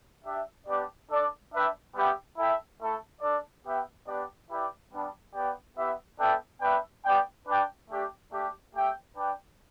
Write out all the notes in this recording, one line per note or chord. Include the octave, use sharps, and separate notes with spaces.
D4 G4 E5
B3 D4 G4 D5
D4 A4 D5
D4 B4 E5 G5
G3 B3 G4 E5 G5
E4 A4 E5 G5
A3 E4 A4
D4 A4 D5
B3 G4 E5 G5
B3 D4 G4 D5
E4 G4 B4 D5 G5
G3 B3 D4
B3 G4 D5 G5
B3 E4 G4 E5
B3 D4 A4 E5 G5
B3 D4 B4 E5 G5
B3 G4 D5 G5
D4 B4 D5 G5
A3 D4 G4
A3 D4 G4
A3 G4 E5 G5
D4 B4 D5 G5